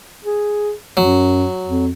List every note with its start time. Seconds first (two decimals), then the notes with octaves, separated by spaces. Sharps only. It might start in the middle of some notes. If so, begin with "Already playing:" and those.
0.24 G#4
0.97 F#2 F#3
1.66 F2